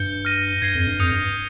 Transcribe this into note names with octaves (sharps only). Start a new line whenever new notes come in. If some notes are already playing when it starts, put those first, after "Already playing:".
Already playing: G2 G6 C#7 G7
F6 A#6 D#7
G2 G#6 C7 G7
F2
G2
F2 D#6 G6 C#7 F7
G2